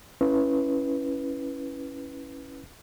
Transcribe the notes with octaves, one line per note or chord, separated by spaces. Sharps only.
C#4 E4 B4